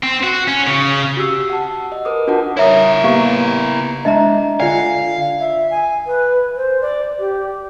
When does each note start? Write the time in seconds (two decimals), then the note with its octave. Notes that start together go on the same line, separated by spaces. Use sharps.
0.04 C4
0.23 F#4
0.48 C#4
0.67 C#3
1.17 F#4 G4 E6 C7
1.50 F#5 A5
1.92 D#5
2.05 A#4 B4 D6 D#6
2.27 D4 F4 F#4 A#4 F#5 A5
2.57 E4 A#4 C#5 E5 D#6
3.04 A#3 B3 G4 F5 A#5 C#6
4.05 G#3 D4 D#5 E5 A5 A#5
4.60 D3 F4 D5 F5 F#5 G#5
5.40 E5
5.71 G#5
6.07 B4
6.56 C5
6.82 D5
7.20 G4